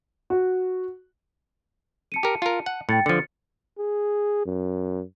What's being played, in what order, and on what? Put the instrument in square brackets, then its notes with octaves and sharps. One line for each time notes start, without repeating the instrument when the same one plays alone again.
[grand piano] F#4
[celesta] A5 C#7 D#7
[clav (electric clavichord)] G4 A#4
F4 A#4
F#5
[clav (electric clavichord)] A2 [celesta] G5 A6 C#7
[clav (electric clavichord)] D3 F3 [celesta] A6 C#7
[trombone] G#4
F#2